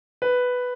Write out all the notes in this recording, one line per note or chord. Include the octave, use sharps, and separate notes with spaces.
B4